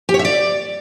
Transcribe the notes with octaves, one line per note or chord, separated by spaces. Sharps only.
G4
C#5
E5
D5